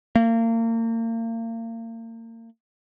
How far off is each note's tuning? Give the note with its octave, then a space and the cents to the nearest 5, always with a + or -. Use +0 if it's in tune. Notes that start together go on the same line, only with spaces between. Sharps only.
A#3 -35